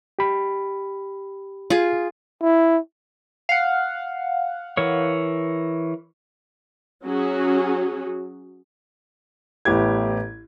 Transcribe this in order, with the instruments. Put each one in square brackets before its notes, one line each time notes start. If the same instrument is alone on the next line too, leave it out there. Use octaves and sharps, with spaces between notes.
[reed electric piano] G4 B5
[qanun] F4 G#4
[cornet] E4
[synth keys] F5 F#5
[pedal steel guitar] E3 A#4 C#5
[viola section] F#3 C#4 F#4 G#4
[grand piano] A1 B3 E4 G4 G#6